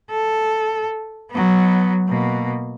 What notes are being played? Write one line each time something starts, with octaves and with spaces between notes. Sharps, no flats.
A4
F#3 B3
B2 A#3